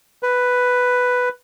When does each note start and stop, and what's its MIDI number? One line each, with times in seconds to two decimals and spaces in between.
0.23 1.29 71